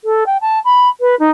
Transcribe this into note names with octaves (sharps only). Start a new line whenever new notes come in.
A4
G5
A5
B5
B4
D#4